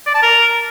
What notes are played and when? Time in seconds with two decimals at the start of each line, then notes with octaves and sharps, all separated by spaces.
0.07 D5
0.15 A5
0.23 A#4